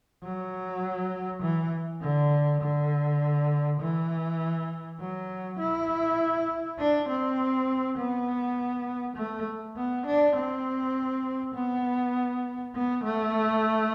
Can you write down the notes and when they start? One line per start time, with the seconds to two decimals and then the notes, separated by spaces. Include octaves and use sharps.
0.23 F#3
1.42 E3
2.02 D3
2.62 D3
3.81 E3
5.00 F#3
5.59 E4
6.79 D4
7.09 C4
7.98 B3
9.16 A3
9.77 B3
10.06 D4
10.36 C4
11.55 B3
12.75 B3
13.04 A3